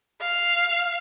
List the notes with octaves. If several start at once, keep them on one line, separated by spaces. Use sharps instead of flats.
F5